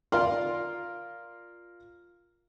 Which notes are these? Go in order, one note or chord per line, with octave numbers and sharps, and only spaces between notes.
F4 A#4 D5 F5 C6